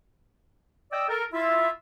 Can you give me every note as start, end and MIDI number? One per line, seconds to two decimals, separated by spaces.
0.92 1.06 74
0.92 1.06 75
0.92 1.06 79
0.92 1.06 88
1.09 1.23 69
1.09 1.23 70
1.32 1.69 64
1.32 1.69 65
1.32 1.69 76